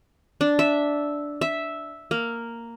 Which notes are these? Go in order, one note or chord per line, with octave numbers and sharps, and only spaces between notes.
D4
E5
E5
A#3